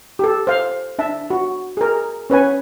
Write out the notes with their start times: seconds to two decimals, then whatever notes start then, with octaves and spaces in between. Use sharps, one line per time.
0.19 G4 A4
0.47 C5 F5
0.99 D4 E5 A5
1.30 F#4
1.77 G#4 A#4
2.30 C#4 B4 C#5 G#5